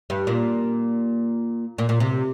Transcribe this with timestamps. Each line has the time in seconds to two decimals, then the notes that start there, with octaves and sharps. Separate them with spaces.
0.10 G2
0.27 A#2
1.78 A#2
1.89 A#2
2.00 C3